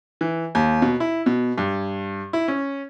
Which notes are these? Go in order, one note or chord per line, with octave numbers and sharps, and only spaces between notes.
E3
D#2
B2
E4
B2
G2
E4
C#4